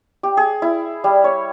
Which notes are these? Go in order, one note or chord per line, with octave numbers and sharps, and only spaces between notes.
G4
G#4
E4
G3
C#5